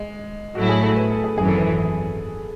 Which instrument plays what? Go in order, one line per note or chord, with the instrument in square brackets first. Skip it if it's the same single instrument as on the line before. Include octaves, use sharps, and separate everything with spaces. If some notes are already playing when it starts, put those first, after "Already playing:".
Already playing: [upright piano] G#3
[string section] A2 F#3 A3 E4 [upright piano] F#4
[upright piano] G#4
A4
B4
A4
G#4
[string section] G#1 F#2 E3 [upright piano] G#4
[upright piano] A4
B4